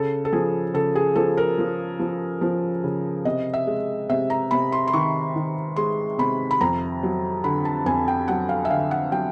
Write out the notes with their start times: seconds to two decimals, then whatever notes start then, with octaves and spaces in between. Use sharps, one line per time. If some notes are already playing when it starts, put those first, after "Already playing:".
Already playing: C#3 A4
0.25 A4
0.32 F3 G#4
0.74 C#3 A4
0.95 G#4
1.16 F3 A4
1.37 A#4
1.59 F3
1.99 F3
2.41 F3
2.84 C#3
3.25 C3 D#5
3.54 E5
3.67 G#3
4.09 C3 E5
4.30 A#5
4.51 C3 B5
4.72 C6
4.88 C6
4.93 D#3 C#6
5.36 D#3
5.76 G#3 C6
6.18 C3 B5
6.51 B5
6.61 F2 A#5
7.03 F#3
7.44 D3 B5
7.65 A5
7.86 F2 G#5
8.08 G5
8.28 F#3 F#5
8.49 F5
8.65 E5
8.70 D3 F5
8.91 F#5
9.12 F#3 G5